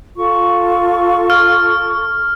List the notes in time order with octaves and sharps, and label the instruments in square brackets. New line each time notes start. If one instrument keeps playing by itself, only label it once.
[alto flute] F4 [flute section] A4 C#6
[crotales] F6